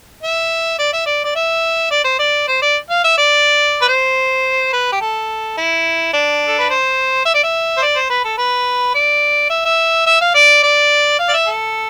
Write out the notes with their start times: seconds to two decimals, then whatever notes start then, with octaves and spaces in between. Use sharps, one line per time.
0.23 E5
0.79 D5
0.93 E5
1.06 D5
1.24 D5
1.35 E5
1.91 D5
2.05 C5
2.19 D5
2.48 C5
2.62 D5
2.90 F5
3.04 E5
3.18 D5
3.82 B4
3.88 C5
4.73 B4
4.92 G4
5.01 A4
5.57 E4
6.13 D4
6.47 A4
6.59 B4
6.70 C5
7.25 E5
7.34 D5
7.43 E5
7.77 C5
7.82 D5
7.96 C5
8.10 B4
8.24 A4
8.38 B4
8.94 D5
9.50 E5
9.65 E5
10.07 E5
10.21 F5
10.35 D5
10.63 D5
11.19 F5
11.29 D5
11.34 E5
11.47 A4